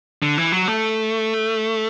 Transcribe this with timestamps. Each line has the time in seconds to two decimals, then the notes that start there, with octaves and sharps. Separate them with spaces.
0.22 D3
0.38 E3
0.52 F#3
0.68 A3